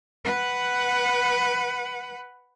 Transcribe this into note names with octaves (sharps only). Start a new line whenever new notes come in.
B4 F#5